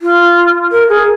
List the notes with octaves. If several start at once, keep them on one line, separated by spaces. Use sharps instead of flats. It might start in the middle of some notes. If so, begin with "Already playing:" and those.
F4
A#4
G#4